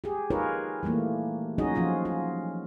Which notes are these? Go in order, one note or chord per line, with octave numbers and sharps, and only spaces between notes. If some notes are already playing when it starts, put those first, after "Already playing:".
G4 G#4
D#4 F4 G#4 A#4 B4 C#5
E3 G3 A3 A#3
F#3 C#4 D#4 F#4 G#4 D#5
F3 C#4 F4 F#4
F4